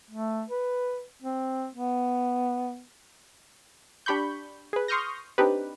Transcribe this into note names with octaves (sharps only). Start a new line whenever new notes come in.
A3
B4
C4
B3
D4 G4 B5 C#6 G6
G#4 B4
C6 C#6 D#6 F6 G6 A#6
C4 D4 D#4 G4 B4